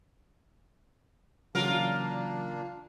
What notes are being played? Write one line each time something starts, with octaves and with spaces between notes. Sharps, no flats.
A#2 C#3 E3 F#3 A#3 D4 F4 A#4